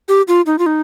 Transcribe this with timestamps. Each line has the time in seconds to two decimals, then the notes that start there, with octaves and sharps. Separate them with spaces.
0.08 G4
0.28 F4
0.46 D#4
0.59 F4
0.66 D#4